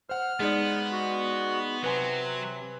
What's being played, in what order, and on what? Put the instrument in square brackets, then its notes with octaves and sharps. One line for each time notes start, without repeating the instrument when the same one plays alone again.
[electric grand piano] C5 F#5 [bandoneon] F6
[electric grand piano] G#3 D#4 D5 [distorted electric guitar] B3
[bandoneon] F#4
[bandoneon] C3 [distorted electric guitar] F#3 [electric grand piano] B4 G#5 C6